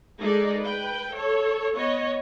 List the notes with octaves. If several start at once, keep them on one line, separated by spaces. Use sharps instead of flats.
G#3 D#4 G#4 A4 D5
B4 G5
A4 C#5
B3 C#5 D#5